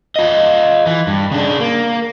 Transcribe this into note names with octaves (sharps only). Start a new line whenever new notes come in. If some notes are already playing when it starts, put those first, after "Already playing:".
F4 D#5
E3
G2
C#3 D4
A#3